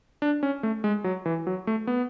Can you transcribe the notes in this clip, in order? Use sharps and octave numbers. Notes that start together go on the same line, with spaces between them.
D4
C#4
A3
G#3
F#3
E3
F#3
A3
B3